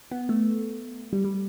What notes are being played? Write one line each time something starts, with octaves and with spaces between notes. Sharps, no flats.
B3
A3
G3
G3